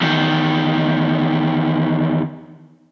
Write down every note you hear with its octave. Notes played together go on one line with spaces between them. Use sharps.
E2 D#3